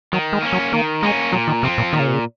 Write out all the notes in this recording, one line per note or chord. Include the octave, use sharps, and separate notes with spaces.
D#3 F#3
G#3
A#3 C#4
F#3
D#3 A#3
G#3 A#3 C#4
A#2 F#3
D#3
C3 F3 C4
A#2
A#2 D#3
C#3
C3
C#3